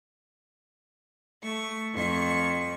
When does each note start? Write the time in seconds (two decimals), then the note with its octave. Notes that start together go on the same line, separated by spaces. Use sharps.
1.42 A3 C#6
1.94 F2 C#6